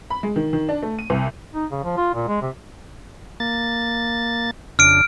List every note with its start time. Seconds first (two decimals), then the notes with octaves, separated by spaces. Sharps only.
0.10 B5
0.23 G#3
0.36 D#3
0.53 D#3
0.69 D4
0.82 A3
0.99 D#7
1.10 C2
1.54 D#4
1.71 C#3
1.84 F3
1.97 F4
2.14 A#2
2.28 G#3
2.42 C3
3.40 A#3 A6
4.79 F2 C#3 D4 F6 D7